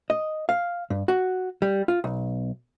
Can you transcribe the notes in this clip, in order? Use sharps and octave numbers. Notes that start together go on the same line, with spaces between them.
D#5
F5
G2
F#4
G3
F4
B1